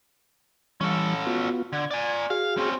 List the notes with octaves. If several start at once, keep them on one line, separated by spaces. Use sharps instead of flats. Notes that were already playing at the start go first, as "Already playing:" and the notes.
E3 G3 C#4 A4
B3 F4 F#4
D3 G#6
D5 G#5
F#4 G#4 F5
C4 C#4